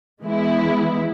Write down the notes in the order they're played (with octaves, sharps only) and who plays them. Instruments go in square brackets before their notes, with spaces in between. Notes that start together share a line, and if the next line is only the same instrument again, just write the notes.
[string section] E3 G#3 B3 E4